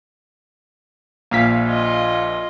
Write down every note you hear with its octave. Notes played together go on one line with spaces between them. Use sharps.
A#1 A#2 A#3 F5 B6
F4 D#5